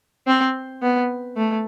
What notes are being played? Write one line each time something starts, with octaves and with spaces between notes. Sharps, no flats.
C4
B3
A3